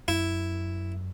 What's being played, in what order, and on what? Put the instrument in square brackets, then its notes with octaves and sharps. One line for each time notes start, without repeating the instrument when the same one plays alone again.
[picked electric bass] F#2 [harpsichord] E4